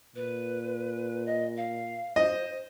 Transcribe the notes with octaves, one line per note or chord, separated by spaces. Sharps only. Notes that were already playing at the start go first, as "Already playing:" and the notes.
A#2 B4
D#5
F5
C5 D#5